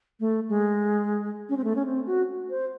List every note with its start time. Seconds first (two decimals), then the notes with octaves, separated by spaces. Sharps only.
0.20 A3
0.49 G#3
1.49 C#4
1.57 C4
1.64 A3
1.76 C#4
1.85 C4
2.06 F#4
2.50 C5